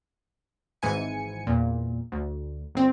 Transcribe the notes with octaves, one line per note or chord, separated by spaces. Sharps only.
G#1 G#2 E3 G#5 C#7
E2 A#2
D2
G1 C4